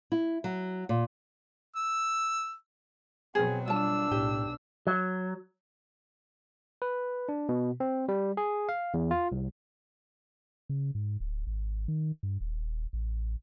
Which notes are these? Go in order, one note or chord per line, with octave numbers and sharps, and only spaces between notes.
E4
F#3
A#2
E6
B2 F#3 C4 G#4
G3 D4 F4 A5 E6
B1 A2 G4
F#3
B4
D4
B2
C4
G3
G#4
F5
E2
F4
C2
C#3
G#2
D1
G#1
D#3
G2
D#1
A1